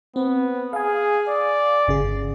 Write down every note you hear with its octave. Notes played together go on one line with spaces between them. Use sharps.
B3 C4
G#4 F5 G#5
D5
G1 C#3 G#4